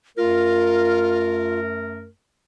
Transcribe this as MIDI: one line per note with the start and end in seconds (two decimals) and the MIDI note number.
0.17 2.07 42
0.17 2.07 57
0.17 1.59 65
0.17 2.07 70